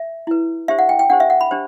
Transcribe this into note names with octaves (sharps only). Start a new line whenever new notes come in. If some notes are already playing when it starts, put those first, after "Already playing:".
Already playing: E5
E4 B4
D4 G4 C5 E5
F#5
G5
G5
D4 G4 C5 F#5
E5
F#5
B5
D4 G4 C5